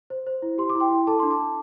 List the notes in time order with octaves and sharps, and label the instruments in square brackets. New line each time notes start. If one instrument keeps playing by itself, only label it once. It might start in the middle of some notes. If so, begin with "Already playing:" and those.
[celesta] C5
C5
E4
G4 C6
D6
E4
G5 C6
E4
A4 A5 D6
D4 C6
A5 D6
D4